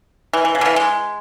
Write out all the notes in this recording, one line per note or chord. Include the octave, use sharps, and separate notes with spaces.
E3
E3
C#3
D3
E3
G#3